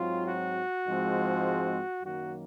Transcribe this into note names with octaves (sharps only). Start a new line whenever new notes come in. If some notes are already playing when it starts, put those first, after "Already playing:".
Already playing: G#2 F#3 C4 F4
F#4
G#2 F3 G#3 C4
F#2 D#3 F#3 A#3 F#4